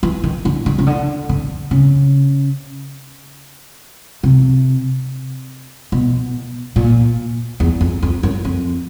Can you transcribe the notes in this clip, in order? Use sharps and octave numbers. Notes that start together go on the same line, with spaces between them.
E3
D#3
D3
D3
C#3
D3
D3
C#3
C3
B2
A#2
E2
F2
F2
F#2
F2